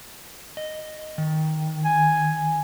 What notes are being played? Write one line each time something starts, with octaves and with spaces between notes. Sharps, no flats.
D#5
D#3
G#5